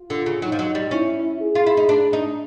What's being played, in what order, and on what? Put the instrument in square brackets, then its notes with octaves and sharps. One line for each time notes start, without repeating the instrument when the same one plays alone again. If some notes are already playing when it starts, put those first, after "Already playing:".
Already playing: [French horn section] F4
[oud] D3
C#3
[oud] F#3 [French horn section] D#4
[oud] F3
F#3
G3
[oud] C#4 [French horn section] E4
[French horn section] G#4
[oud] F4
E4
D#4
D4
D#4